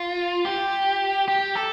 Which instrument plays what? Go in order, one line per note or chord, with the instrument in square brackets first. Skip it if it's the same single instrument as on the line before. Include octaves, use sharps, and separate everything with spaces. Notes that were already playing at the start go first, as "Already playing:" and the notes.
Already playing: [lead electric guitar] F4
G4
G4
A4